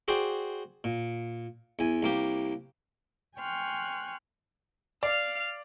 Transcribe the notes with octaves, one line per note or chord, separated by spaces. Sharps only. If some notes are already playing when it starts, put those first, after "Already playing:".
F#4 G#4 C5 D5 G5
A#2
E2 G#5
C2 A#3 G4
G5 G#5 C6 C#6 F6 F#6
D5 F5 F6